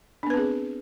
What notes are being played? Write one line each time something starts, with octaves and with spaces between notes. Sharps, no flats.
B3 C4 D4 G#4 B4